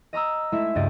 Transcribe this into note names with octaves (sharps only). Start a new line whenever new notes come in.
D#5 A#5 D#6 E6
G#3 A3 E4 G#4 E5
C#2 G2 D#5 A6 D7